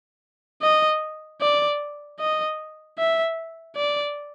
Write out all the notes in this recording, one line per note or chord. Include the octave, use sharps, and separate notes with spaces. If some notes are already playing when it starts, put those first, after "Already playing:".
D#5
D5
D#5
E5
D5